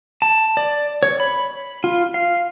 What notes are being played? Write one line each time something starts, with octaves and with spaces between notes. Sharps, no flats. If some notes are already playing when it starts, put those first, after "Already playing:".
A5
D5
C#5
B5
F4
F5